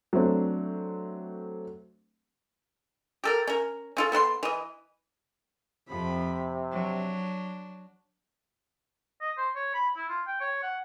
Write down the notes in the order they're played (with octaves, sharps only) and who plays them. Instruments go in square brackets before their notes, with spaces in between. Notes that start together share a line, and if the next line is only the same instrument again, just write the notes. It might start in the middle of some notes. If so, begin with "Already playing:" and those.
[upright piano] F#3 A3 C4 D4
[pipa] G4 A4 A#4
C#4 A#4
C#4 F4 A4
B3 A4 F#5 C6
E3 D#5
[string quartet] F2 F3 B5 [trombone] C3
[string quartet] F#3 D4
[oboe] D#5
C5
C#5
B5
E4
F4
G5
C#5
F#5